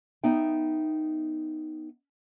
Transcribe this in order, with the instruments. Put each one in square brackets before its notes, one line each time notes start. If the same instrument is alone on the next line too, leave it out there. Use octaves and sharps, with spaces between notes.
[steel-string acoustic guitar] B3 D#4 E5 G5